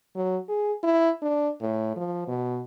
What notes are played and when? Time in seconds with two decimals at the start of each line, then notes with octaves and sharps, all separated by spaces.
0.15 F#3
0.49 G#4
0.83 E4
1.22 D4
1.61 A2
1.97 F3
2.27 B2